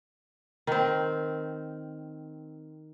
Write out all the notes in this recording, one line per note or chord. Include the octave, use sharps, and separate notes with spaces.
D#3 C4